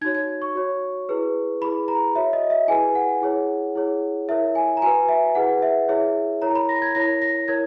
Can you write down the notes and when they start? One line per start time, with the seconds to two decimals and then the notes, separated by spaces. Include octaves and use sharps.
0.01 D#4 F#4 C#5 G#6
0.15 G#6
0.42 C#6
0.55 F#4 C#5
1.09 E4 G#4 B4
1.61 E4 G#4 B4 B5
1.88 A#5
2.15 F#4 C#5 E5
2.33 D#5
2.50 E5
2.68 E4 G#4 B4 G#5
2.95 F#5
3.21 E4 G#4 C#5
3.76 E4 G#4 C#5
4.29 E4 A#4 C#5 E5
4.55 G#5
4.77 A#5
4.82 F#4 B4 G#5
5.09 E5
5.35 E4 G#4 B4 F#5
5.62 E5
5.88 E4 G#4 C#5 E5
6.42 E4 A#4 C#5 A#5
6.55 B5
6.69 A#6
6.82 G#6
6.95 E4 A#4 C#5 A#6
7.22 A#6
7.48 E4 A#4 C#5 G#6